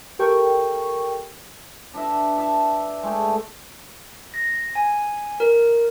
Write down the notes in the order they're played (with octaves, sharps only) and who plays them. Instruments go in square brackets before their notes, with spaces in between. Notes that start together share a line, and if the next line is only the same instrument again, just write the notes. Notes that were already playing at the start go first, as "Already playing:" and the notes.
[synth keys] G4 A4 A#4 G5 C#6
[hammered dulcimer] D4 B4 D#5 E5
E5 A5
G#3 A3 G5
[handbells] A#6
G#5
A#4